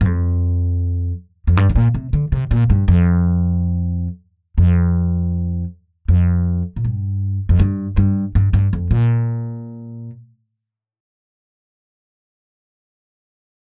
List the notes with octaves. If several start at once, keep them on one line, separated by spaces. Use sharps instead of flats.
G2
F2
F2
G2
G2
A#2
C3
D3
C3
A#2
G2
F2
F2
F2
A#2
G2
F2
G2
G2
G2
G2
F2
A#2